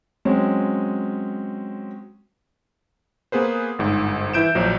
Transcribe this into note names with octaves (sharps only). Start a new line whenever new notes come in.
F#3 G#3 C4 C#4
A#3 B3 G#4 B4 C5
G1 G#2
E3 E4 G6 D7 E7
A#1 F3 F#3